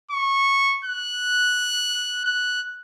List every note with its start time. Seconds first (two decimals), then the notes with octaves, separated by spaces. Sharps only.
0.11 C#6
0.85 F#6
2.25 F#6